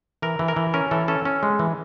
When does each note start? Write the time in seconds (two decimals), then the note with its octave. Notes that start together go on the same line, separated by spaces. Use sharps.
0.22 E3 A#4
0.39 E3
0.48 A#4
0.56 E3
0.74 C#4 A#4
0.91 E3 A4
1.08 C#4 A4
1.25 C#4
1.43 G#3
1.59 E3